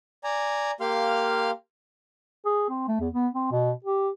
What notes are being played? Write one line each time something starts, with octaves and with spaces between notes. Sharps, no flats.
D5 G#5 A#5
A#3 G4 F5 C6 F6
G#4
C4
A3
E2
B3
C4
B2
G4